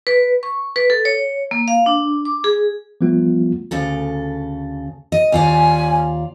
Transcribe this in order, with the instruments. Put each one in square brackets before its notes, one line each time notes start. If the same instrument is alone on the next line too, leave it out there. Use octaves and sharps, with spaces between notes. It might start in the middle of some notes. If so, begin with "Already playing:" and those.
[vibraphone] B4
C#6
B4
A4
C#5
A#3
F5
D4
D6
G#4
[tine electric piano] F3 G3 A3 B3 F4
[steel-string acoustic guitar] D2 C#3 A4
D#5
[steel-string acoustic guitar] D#2 F4 D5 [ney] G#5